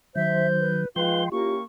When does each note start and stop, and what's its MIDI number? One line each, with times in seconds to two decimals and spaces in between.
0.16 0.85 51
0.16 0.85 54
0.16 0.68 72
0.16 0.47 76
0.16 0.81 91
0.59 0.88 71
0.96 1.29 53
0.96 1.24 56
0.96 1.24 63
0.96 1.24 65
0.96 1.23 71
0.96 1.29 79
0.96 1.29 84
0.96 1.24 103
1.32 1.64 58
1.32 1.58 61
1.32 1.58 64
1.32 1.54 65
1.32 1.58 67
1.32 1.63 85